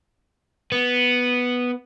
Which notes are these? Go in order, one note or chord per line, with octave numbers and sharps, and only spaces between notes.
B3